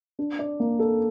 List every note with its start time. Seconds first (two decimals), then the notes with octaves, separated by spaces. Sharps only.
0.19 D4
0.39 D5
0.60 A#3
0.79 A4